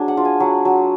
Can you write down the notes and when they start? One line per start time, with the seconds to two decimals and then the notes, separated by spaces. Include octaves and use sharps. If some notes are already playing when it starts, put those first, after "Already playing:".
Already playing: F#3 D4 G#4
0.08 F#5
0.17 F4
0.25 G#5
0.40 F#3
0.65 F#3